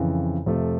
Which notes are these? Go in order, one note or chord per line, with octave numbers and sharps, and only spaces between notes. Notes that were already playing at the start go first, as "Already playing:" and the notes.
Already playing: F2 C#3 E3
F2 C3 F3 A3